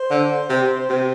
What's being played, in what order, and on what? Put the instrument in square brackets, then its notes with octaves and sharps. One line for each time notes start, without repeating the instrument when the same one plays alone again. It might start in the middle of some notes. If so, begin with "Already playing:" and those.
Already playing: [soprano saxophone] C5
[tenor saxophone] D3
C3
C3